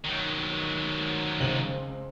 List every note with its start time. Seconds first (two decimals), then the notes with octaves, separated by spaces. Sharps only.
0.05 D#3 F#3
1.40 C#2 C4 F#7